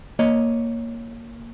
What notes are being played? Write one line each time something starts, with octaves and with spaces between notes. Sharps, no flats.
A#3 C#5 D#5